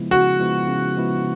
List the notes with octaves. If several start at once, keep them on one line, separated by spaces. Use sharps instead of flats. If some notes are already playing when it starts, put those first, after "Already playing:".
Already playing: C#3 F3 G#3 B3 E4
C#3 F#4
F3 G#3 B3 E4
C#3
F3 G#3 B3 E4